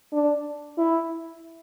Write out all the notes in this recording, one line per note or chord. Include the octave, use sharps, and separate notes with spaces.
D4
E4